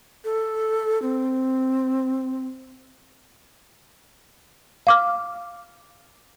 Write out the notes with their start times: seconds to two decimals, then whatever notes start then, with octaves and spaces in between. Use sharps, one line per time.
0.24 A4
1.02 C4
4.87 F5 D6 F6